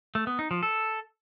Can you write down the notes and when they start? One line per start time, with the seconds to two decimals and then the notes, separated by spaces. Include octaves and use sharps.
0.15 A3
0.27 B3
0.39 D#4
0.51 F3
0.63 A4